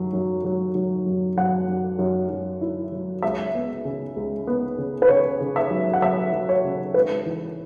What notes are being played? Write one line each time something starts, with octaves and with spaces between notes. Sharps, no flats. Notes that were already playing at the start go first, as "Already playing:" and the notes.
Already playing: F#2 F#3
F#2
F#3
F#3
F#2
F#2 F#5
F#2
F#2
F#2
E4
F#3
C#2 E5
B3
C#3
C#2
B3
C#3
B4
C#3 C#5
C#3
E5
F#3
F#5
F#3 E5
F#3
C#5
C#3
G#1 B4
E3